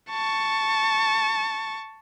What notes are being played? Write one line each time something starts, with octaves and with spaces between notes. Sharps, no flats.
A5 C#6